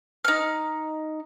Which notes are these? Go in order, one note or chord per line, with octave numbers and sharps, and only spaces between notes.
D#4 F6